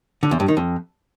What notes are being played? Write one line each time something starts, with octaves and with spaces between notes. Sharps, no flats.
D3
E2
G2
D#3
F2